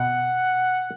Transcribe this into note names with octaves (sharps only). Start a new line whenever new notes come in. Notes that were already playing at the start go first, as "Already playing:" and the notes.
Already playing: B2 F#5